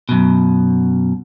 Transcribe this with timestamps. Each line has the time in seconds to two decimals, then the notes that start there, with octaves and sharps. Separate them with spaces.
0.09 F#2 B2